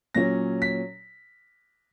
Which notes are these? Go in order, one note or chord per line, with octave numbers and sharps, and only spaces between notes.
A#2 F#3 C#4 A#6
B6